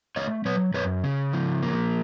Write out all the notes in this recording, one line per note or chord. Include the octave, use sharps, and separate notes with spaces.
A3 C#5 D#5
F#3 B4 C#5
F#2 B4 C#5
C#3
F3
A#3